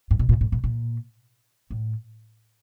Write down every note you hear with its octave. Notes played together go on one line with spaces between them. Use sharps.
G#2
B2
A#2
A2
A#2
A#2
A2